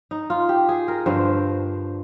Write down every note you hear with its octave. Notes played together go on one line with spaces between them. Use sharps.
D#4
F4
G4
G#4
A#4
G2 D3 F3 C5